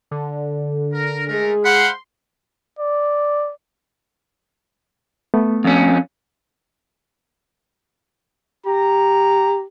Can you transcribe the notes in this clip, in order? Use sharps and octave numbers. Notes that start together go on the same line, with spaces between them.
D3
A#4
G#3 A3 G#4 A#4
C5 F5 F#5 B5 C6
D5
A3 B3
F2 C#4
G4 A#5